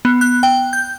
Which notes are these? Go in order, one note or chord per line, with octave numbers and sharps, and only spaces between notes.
B3
F#6
G5
G6